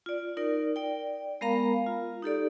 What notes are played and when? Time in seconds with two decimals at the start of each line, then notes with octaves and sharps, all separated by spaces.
0.06 F4 D5
0.37 D#4 A#4 D5
0.76 D5 G5
1.41 G#3 B3 A#4 F5 A#5 B5
1.87 F4
2.22 D#4 G4 A4 D5